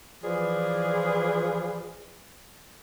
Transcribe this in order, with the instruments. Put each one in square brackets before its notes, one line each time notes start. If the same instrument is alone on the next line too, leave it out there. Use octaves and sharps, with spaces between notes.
[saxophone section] E3 F3 G#4 B4 D5